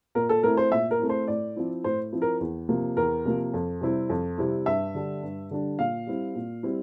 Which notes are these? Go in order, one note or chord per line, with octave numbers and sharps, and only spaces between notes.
A#2 A#4
A4
A3 C4 E4 A#4
C5
A#2 E5
A#4
A3 C4 E4
C5
A2 D5
F3 C4 E4
A2 C5
F3 C4 E4
A#4
E2
C3 F3 A#3
E2 A#4
C3 F3 A#3
F2
C3 G3 C4 E4
F2
C3 G3 C4 E4
G2 E5
D3 G3 D4
G2
D3 G3 D4
A#2 F5
G3 C4 E4
A#2
G3 C4 E4